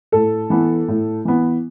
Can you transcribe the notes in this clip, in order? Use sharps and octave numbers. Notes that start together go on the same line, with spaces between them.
A2 A4
E3 B3
A2
E3 B3